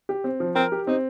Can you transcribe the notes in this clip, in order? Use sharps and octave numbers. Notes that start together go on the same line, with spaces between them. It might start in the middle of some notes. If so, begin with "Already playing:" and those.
G4
C4
F3
C4 A#4
G4
C4 D#4